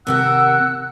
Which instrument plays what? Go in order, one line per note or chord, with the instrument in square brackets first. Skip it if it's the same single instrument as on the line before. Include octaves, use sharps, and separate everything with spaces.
[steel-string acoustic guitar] D#2 C3 A#4 [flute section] F#5 E6 F#6